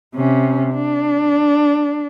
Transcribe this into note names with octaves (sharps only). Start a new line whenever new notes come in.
C3 C#4
D4